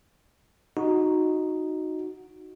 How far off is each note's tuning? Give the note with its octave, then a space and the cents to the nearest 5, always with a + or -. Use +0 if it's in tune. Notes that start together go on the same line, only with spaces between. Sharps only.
D#4 +0 F#4 -10